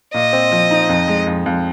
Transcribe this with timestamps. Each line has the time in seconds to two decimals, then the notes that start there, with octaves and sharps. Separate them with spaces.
0.14 A#2 D#5
0.33 C4
0.51 F3
0.71 D#4
0.89 F2
1.08 G#3
1.27 F2
1.46 F2